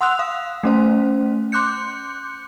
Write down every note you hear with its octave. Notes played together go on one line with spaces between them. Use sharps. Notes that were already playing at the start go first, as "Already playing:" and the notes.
F#5 C6 D#6 E6 F#6 F7
F5
A3 C#4 C5
C6 D6 F#6 G6 C#7